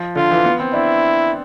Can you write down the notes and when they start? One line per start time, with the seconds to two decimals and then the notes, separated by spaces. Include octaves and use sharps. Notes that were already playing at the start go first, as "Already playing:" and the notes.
Already playing: F3
0.16 D3 F4
0.31 E3
0.45 B3
0.60 C4
0.73 D4 E4